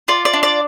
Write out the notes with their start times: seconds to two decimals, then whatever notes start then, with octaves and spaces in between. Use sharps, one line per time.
0.08 F4 D5
0.25 D5
0.33 D4
0.43 D5